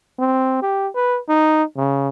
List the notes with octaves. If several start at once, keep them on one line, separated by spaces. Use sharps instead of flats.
C4
G4
B4
D#4
C#3